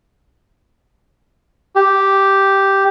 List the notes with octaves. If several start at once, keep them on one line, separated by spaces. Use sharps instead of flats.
G4